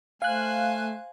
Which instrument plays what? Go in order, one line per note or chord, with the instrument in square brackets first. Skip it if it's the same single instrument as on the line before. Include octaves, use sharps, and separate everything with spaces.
[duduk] A3 [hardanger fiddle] C5 G#5 [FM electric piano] F5 F#6